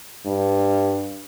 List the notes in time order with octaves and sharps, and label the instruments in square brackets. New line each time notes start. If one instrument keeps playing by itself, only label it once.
[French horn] G2